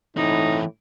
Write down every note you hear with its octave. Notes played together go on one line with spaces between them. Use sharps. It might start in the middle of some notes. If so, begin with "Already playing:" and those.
A2 E3 C4 D#4